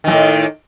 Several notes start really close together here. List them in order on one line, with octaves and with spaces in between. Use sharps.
D#3 F#2 A2